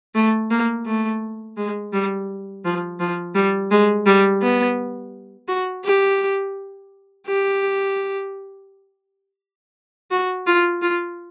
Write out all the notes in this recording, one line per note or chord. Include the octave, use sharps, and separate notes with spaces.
A3
A#3
A3
G#3
G3
F3
F3
G3
G#3
G3
B3
F#4
G4
G4
F#4
F4
F4